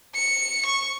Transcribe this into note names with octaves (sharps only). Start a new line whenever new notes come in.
C#7
C#6